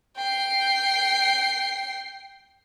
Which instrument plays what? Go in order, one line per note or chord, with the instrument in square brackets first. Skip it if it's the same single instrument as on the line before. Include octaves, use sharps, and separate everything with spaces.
[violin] G5 C7